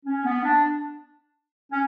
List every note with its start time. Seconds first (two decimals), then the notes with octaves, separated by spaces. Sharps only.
0.06 C#4
0.25 B3
0.44 D4
1.71 C#4